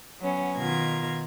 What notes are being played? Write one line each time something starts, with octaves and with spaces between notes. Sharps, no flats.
F#3 B3 C#4
B2 D#3 F4 A#5 G#6